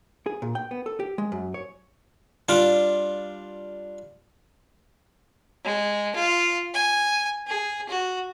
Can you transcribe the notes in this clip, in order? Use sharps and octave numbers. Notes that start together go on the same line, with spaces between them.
G#4
A#2
G5
B3
A4
G4
G#3
F#2
C#5
G3 D4 F4
G#3
F4
G#5
G#4
F#4